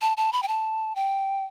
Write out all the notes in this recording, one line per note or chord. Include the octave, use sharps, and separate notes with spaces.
A5
A5
B5
G5
A5
G5